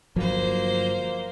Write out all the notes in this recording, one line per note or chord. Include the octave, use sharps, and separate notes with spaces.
G1 F3 F#3 A#3 C5